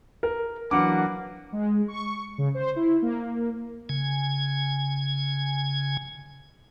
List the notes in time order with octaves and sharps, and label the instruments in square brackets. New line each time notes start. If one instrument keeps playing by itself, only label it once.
[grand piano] A#4
[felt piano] E3 F#3 D4 [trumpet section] A#3 B4 F#5 [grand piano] D6
[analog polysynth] G#3
C#6
C#3
C5
E4
A#3
[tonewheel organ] C#3 G#5